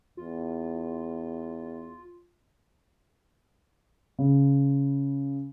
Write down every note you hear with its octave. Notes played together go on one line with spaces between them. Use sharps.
E2 F4
C#3